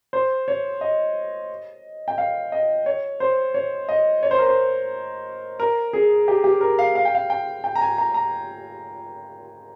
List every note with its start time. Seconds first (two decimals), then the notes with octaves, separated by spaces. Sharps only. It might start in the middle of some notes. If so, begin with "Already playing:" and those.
0.13 C5
0.48 C#5
0.81 D#5
2.08 G5
2.18 F5
2.52 D#5
2.86 C#5
3.20 C5
3.54 C#5
3.89 D#5
4.23 C#5
4.31 C5
4.38 A#4
4.46 C5
5.60 A#4
5.93 G#4
6.28 G4
6.44 G4
6.61 A#4
6.79 F5
6.95 F5
7.05 G5
7.15 F5
7.30 G5
7.64 G5
7.75 A#5
7.81 G#5
7.98 A#5
8.14 A#5